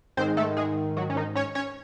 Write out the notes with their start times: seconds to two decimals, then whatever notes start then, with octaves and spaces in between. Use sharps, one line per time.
0.17 G#2 D#3 G#3 C4 C5
0.37 A3 A4
0.57 G#3 G#4
0.97 F#3 F#4
1.10 C#4
1.16 D#3 D#4
1.35 C#4 C#5
1.55 C#4 C#5